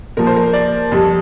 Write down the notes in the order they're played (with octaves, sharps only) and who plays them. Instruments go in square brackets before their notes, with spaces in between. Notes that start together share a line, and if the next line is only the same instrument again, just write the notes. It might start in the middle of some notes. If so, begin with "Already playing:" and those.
[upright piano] A#2 F3 A#4
C5
A#4
D5
F2 C3 G3